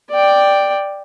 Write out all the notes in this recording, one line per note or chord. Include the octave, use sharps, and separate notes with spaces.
D5 G5